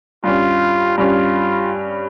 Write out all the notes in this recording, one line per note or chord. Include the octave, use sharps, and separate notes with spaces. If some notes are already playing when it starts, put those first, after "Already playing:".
G2 G3 C#4 F4
G2 G3 C#4 F4